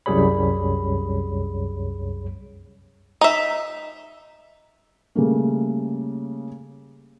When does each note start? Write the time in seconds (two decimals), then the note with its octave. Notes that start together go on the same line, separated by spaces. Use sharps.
0.06 C2 F#2 G3 G#4 C#5 B5
3.21 D#4 E5
5.15 C#3 G3 A3 A#3